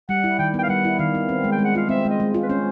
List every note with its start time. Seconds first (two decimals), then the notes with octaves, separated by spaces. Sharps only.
0.09 G3 F#5
0.24 E4
0.39 D#3 G5
0.54 B3 G5
0.63 F5
0.69 G3 F#5
0.85 E4
0.99 D#3 F5
1.15 B3
1.29 C4
1.44 G#3
1.52 G5
1.59 G#3
1.64 F#5
1.75 F4 F5
1.89 C4 E5
2.05 G#3 D#5
2.20 G#3
2.34 F4
2.43 B4
2.50 C#4 C5